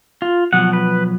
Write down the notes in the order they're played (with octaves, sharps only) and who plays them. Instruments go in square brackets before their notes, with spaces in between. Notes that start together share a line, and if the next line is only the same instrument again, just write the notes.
[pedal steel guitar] F4
[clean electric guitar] B2 F3 F#3 [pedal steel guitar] F#5
[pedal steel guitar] B4